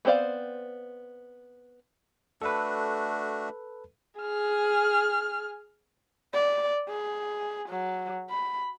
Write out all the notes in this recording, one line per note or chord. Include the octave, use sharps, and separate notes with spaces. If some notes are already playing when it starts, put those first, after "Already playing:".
B3 C4 C5 D5 F5
A3 D4 F#4 A4 B4
G#4 F6
D5
G#4
F#3
B5